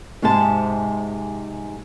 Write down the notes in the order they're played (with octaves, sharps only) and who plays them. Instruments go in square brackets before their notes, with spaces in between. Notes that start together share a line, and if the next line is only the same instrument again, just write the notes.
[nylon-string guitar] G#2 C3 G#3 G5 A5